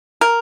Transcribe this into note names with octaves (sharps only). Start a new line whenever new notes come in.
A#4